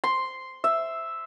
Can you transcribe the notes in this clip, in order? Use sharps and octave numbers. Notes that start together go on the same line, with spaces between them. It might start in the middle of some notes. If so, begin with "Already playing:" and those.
C6
E5